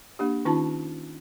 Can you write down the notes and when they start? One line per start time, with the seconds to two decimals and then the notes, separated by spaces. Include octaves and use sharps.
0.19 A#3 D4 G4
0.45 D#3 C#4 D#4 F4 A5